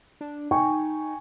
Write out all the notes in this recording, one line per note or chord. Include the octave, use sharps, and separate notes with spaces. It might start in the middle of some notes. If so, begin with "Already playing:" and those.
D4
D#4 G5 G#5 C#6